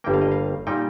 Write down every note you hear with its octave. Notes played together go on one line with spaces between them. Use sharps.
G1 G2 G3 A#3 G5
F5
D#5
F5
A#2 G3 D#4 G5